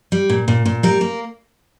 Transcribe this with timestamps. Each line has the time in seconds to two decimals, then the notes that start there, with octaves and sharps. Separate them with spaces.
0.12 G3
0.30 A#2
0.48 A#2
0.66 A#2
0.83 G3 A#4
1.01 A#3